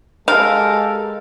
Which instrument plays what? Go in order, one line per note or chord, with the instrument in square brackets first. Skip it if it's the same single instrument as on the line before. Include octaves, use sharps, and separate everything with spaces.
[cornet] G#3 [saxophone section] G4 A#4 [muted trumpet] A4 [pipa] F5